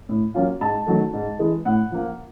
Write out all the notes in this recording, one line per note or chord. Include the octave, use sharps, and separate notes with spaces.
A2
F#3 A#3 C#4 F4
G#2 A5
D#3 F#3 A3
G#2
E3 G#3
A2 F#5
F3 A#3